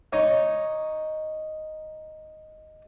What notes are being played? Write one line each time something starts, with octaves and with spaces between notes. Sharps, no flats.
D#4 C#5